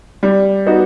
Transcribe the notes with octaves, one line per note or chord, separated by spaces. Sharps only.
G3
B3 D#4 F#4